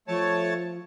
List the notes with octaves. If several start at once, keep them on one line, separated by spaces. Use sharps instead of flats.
F3 A3 C#5 A5